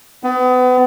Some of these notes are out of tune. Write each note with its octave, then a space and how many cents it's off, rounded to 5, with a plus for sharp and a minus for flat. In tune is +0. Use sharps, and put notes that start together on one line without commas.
B3 +35